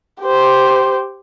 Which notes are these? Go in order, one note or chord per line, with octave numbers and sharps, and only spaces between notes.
G4 C5